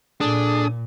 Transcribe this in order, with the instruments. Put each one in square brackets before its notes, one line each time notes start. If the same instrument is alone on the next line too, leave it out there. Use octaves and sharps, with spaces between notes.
[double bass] A#2 [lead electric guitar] D4 [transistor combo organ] G#4 A4 D#6